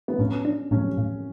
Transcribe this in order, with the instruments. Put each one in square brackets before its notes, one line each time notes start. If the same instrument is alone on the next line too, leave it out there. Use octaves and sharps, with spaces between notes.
[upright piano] B3
[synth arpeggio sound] A2 [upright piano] C#4
[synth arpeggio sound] D4
[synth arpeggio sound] A2 [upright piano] C#4
[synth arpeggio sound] A2